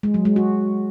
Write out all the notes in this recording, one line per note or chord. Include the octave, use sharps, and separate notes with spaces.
G#3
F#3
G#3
F#4